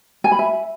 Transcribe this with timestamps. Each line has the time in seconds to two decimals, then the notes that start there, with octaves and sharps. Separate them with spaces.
0.24 G#5
0.32 B5
0.39 E5